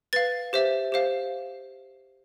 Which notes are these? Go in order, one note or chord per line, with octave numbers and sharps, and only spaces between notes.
B4 F5 A6
G4 C5 E5
G4 C5 F5